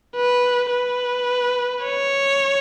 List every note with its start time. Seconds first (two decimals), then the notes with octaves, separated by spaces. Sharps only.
0.16 B4
0.72 B4
1.85 C#5